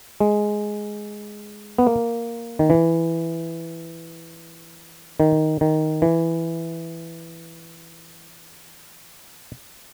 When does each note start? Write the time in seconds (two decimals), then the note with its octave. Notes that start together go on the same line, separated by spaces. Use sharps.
0.20 G#3
1.79 B3
1.87 A#3
2.59 D#3
2.70 E3
5.20 D#3
5.61 D#3
6.02 E3